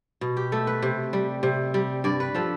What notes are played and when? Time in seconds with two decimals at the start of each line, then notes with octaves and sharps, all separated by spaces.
0.21 B2
0.37 G4
0.52 A3 A4
0.67 B4
0.82 C3
1.13 G3
1.43 C3
1.74 G3
2.04 G2 D5
2.20 B4
2.35 F3 A4